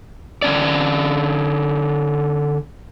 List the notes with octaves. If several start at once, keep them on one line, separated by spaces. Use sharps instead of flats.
D3 C#4 D5